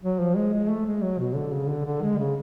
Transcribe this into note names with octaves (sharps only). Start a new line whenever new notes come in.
F#3
F3
G#3
G#3
A3
G#3
F#3
B2
D3
C#3
D3
D3
G#3
C#3